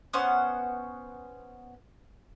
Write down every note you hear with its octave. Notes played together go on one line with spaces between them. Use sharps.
B3 C#4 C5 F#5